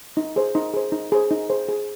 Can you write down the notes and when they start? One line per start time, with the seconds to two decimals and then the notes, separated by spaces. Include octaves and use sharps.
0.17 D#4
0.36 G#4 C5
0.55 D#4
0.74 G#4 C5
0.92 D#4
1.12 G#4 C5
1.31 D#4
1.50 G#4 C5
1.69 G#4